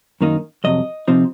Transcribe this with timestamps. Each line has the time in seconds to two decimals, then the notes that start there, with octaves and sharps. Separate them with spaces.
0.21 F#2 D#3 A#3 D#4
0.64 F2 C3 F#3 D#5
1.08 C3 F3 C4 D#4